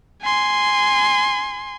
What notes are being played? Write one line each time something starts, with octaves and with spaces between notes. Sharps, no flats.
G#5 C6